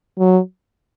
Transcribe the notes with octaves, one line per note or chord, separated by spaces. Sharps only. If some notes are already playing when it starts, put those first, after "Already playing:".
F#3